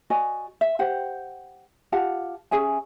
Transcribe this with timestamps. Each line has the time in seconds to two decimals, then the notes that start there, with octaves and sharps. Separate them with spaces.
0.10 F#4 D5 D#5 G#5
0.61 E5
0.79 G4 C5 F#5
1.92 F4 G4 F#5 A5
2.51 C#4 G#4 E5 G#5